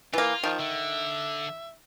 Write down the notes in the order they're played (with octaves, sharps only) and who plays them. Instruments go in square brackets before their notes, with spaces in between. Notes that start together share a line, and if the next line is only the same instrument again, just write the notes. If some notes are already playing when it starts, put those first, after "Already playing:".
[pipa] E3 A#3 [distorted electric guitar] F4
[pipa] D#3 [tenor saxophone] F3
[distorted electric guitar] D3 [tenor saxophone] E5